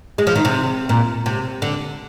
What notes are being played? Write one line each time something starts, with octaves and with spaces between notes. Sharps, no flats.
G#3
F3
D#3
C3
A#2
C3
D3